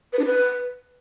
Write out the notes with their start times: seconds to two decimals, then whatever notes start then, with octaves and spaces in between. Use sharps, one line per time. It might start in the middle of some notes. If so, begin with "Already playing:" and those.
0.13 B4
0.19 D4
0.26 B4